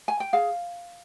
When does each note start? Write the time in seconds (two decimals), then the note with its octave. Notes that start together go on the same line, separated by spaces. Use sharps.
0.08 G#5
0.20 G5
0.33 G#4 F5